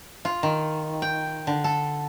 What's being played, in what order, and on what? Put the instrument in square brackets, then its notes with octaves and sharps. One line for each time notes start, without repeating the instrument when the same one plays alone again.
[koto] F4
D#3
G5
D3
A4